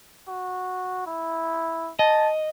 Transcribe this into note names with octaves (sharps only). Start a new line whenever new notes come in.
F#4
E4
D#5 A5